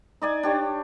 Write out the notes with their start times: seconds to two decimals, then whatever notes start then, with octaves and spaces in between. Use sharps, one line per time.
0.22 D#4 D5 G#5
0.43 D4 G4 C#5